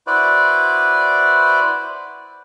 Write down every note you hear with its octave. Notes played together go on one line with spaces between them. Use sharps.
E4 F#4 B4 C5 D5